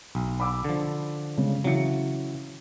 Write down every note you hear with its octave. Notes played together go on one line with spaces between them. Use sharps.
B1
B5 D6 E6
D3 F3
C#3 G#3
C#3 E3 F#3 C#7